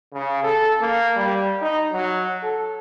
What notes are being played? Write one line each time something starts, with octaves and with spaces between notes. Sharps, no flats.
C#3
A4
A#3
G3
D#4
F#3
A4